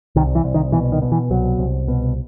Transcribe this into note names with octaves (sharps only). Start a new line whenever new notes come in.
C2 D#3
E3
C2
D#3
B2 E3
D#3
B2
E3
C2 F#3
C2
B2